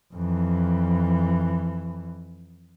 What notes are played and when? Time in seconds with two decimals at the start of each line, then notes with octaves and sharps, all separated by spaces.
0.14 F2 E3